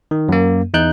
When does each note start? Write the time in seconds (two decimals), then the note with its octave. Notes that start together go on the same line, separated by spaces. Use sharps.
0.11 D#3
0.29 F#2 A#3
0.74 E2 D#4 F#6 G6